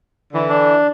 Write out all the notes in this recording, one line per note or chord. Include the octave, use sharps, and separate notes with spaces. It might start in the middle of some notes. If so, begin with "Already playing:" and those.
D3 E3
D4